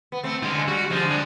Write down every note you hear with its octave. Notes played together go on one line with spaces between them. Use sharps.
B3
A3 C4
D3 G#3 F4
G3 F#4
D3 F3 G#3
D4 B4